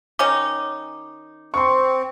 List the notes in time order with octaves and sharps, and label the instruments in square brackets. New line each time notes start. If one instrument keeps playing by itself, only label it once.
[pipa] D#3 C#4 D#4 [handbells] D6
[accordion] C4 [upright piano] C6 C#6